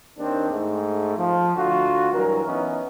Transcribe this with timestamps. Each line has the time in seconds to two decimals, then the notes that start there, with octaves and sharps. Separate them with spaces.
0.18 D#2 D#3 C4 D4
0.50 G#2 A3
1.17 F3
1.56 D2 F4 F#4
2.12 G2 E3 F#3 A#4
2.45 E3 B3 C#4 D#4 E4